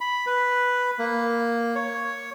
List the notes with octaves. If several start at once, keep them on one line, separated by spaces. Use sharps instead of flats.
B5
B4
A#3
C#5